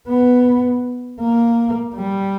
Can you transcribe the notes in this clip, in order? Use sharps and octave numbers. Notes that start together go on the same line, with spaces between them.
B3
A#3
G3